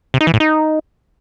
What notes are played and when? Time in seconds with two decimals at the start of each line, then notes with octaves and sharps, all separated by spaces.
0.14 C3
0.21 D#4
0.27 E3
0.34 A2
0.40 D#4